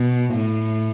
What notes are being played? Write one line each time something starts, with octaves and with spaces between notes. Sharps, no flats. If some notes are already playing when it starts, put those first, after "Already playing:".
Already playing: B2
A2